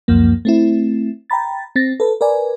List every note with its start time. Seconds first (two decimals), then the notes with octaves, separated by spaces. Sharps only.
0.08 C#2 F#2 F3 A#3
0.45 A3 C4 E4
1.30 G5 A#5 B5 A6
1.76 C4 A6 A#6
2.00 A4 B4
2.21 A#4 B4 D5 G#5